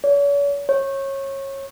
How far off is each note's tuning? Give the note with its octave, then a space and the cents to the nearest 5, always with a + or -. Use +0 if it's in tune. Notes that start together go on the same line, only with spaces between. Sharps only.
C#5 +45
C#5 -25